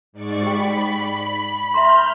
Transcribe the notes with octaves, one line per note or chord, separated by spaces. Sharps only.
G#2 D5 C#6
G4 G5 B5
E5 A#5 C6 F6 G6